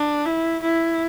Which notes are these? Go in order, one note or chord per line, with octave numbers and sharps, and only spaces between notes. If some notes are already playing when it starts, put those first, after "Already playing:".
Already playing: D4
E4
E4